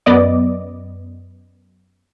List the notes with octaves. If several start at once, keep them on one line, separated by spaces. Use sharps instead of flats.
F#2 B3 D5 D#5 D6